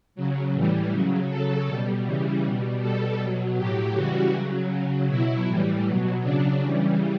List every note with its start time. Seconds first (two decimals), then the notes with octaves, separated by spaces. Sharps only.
0.15 C#3 F#3
0.53 A2 E3 G3
0.91 C#3 F#3
1.29 C#3 F#3 A4
1.67 B2 G3
2.05 C#3 E3 G3
2.43 B2 G3
2.81 B2 G3 A4
3.18 B2 F#3
3.57 A2 F#3 G4
3.94 C#3 E3 G3 F#4
4.33 C#3 F#3
4.71 C#3 F#3
5.08 B2 F#3 E4
5.47 A2 E3 G3
5.85 B2 F#3
6.22 C#3 F#3 D4
6.60 C#3 E3 G3